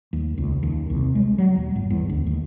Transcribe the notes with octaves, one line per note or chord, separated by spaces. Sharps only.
D#2
C#2
D#2
C2
G#3
F#3
D#1
G1
E2
D2
D#2